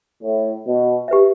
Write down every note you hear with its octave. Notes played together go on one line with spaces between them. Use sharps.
A2
B2
G4 B4 E5